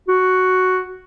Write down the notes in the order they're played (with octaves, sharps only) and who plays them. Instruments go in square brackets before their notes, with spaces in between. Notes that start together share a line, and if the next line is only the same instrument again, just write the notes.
[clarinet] F#4